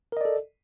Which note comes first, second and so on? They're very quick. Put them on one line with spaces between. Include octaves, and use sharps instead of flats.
A#4 D#5 D5 A4